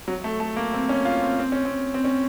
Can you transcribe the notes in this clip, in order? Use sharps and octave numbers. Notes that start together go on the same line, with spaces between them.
F#3
A3
A3
A#3
C4
C#4
F4
C4
C4
C#4
C4
C4
C#4